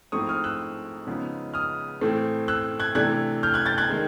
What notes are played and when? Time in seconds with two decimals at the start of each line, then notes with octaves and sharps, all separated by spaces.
0.12 G#2 F3 A3 C4 E4 C#6 D#6
0.29 D#6 F6
0.44 E6 F#6
1.07 C#3 F3 G#3 B3 D#4
1.54 D#6 F6
2.01 A2 E3 A3 C4
2.48 E6 F#6
2.80 F#6 G#6
2.95 C3 E3 A3 D4 F#6 G#6
3.43 F6 G6
3.54 F#6 G#6
3.66 G6 A6
3.78 F#6 G#6
3.90 D#3 G#3